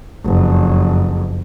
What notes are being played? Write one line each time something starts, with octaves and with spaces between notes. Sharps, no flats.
F#1 F2